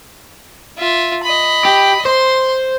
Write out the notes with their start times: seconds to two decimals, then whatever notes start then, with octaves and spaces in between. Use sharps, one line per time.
0.78 F4 E5
1.23 D#5 B5
1.65 G4
2.05 C5 C6